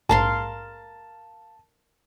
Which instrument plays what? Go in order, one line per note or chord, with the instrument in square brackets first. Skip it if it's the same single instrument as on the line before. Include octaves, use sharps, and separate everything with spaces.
[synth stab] A#1 G#2 [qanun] A#4 F5 C6 [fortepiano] A5